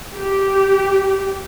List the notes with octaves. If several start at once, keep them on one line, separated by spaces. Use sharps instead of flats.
G4